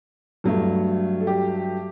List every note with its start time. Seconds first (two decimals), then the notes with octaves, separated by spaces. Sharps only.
0.44 G2 F#3 A3
1.21 A4
1.27 G4